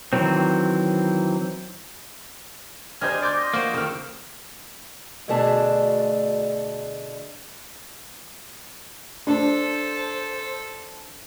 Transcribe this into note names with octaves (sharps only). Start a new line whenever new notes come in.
D#3 E3 F#3 C4
C4 D4 G4 C5 D#5 G#5 F6
D5 C6 D6 G6
D#5
F3 A#3 F#4 C5
C#2 D#3 A4 F6
D2 B2 A3 D4 G#4 A5
D4 A4 C5